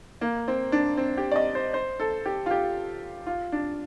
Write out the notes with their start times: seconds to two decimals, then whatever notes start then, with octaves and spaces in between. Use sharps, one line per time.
0.21 A#3
0.48 C4
0.72 D4
0.97 C4
1.17 G4
1.31 D5
1.36 D#5
1.55 C5
1.74 C5
2.00 A4
2.26 G4
2.46 F4
2.51 G4
3.27 F4
3.52 D4